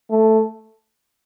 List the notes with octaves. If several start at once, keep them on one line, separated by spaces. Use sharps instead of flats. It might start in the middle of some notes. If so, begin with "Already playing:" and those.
A3